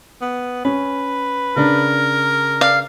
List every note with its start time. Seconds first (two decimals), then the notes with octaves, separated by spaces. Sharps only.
0.22 B3
0.65 C#4 B4
1.56 C#3 D4 A#4
2.61 D5 F5